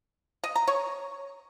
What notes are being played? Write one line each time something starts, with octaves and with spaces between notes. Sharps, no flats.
D#5
A#5
C#5